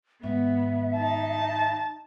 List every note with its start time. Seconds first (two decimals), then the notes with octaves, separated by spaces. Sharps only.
0.23 G#2 D#3 B3 E5
0.97 D#4 A5